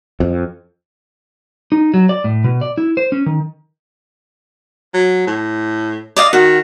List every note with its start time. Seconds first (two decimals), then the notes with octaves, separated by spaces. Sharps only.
0.20 F2
1.72 D#4
1.94 F#3
2.09 D5
2.24 A2
2.44 B2
2.61 D5
2.78 E4
2.97 C5
3.12 C#4
3.26 D#3
4.94 F#3
5.27 A2
6.17 D5 D#5 F5
6.33 D#3 F#4